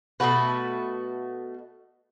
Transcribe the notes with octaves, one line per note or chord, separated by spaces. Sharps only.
B2 A3 F#4 B4